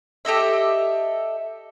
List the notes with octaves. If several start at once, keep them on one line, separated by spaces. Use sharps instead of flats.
G4 A4 D#5 E5